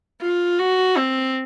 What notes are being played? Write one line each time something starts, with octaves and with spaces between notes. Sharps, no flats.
F4
F#4
C4